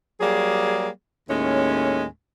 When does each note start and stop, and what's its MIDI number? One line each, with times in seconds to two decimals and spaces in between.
0.20 0.88 54
0.20 0.88 55
0.20 0.88 58
0.20 0.88 68
1.29 2.06 39
1.29 2.06 45
1.29 2.06 56
1.29 2.06 61